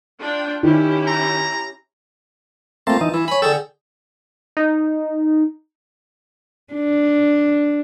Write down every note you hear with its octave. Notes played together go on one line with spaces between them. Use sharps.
D4 F4 G5
D#3 C#4 E4 G4
A#5
A3 A#3 C4 F4 A5
E3 D#4
E3 E4
C#5 G#5 B5
D3 G#4 A4 G5 E6
D#4
D4